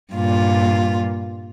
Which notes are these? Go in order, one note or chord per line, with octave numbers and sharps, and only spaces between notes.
G2 A#2 F4